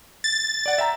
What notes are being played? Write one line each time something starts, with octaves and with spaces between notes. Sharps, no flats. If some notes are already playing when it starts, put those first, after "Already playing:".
A6
D5 F#5
E5 G5 A#5